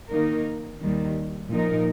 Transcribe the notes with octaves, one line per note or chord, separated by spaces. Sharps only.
D#3 A#3 D#4 A#4
D#2 D#3 G3
A#2 F3 D#4 A#4